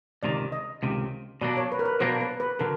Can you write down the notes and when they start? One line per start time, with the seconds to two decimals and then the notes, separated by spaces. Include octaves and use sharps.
0.23 C#2 C3 D#3 D5
0.52 D#5
0.83 C#2 C3 D#3
1.41 B2 F#3 A#3 D4 D5
1.57 C#5
1.72 B4
1.79 A#4
1.85 B4
2.00 B2 F#3 A#3 D4 C5
2.21 B4
2.40 B4
2.59 D3 F#3 A#4